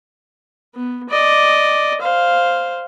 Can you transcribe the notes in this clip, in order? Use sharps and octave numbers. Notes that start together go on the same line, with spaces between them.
B3
D5 D#5
C5 F5